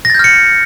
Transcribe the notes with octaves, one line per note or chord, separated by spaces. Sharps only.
F6 G6 A6 A#6 C#7